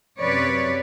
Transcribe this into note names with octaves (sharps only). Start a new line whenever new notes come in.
F#2 C3 B4 C#5 D5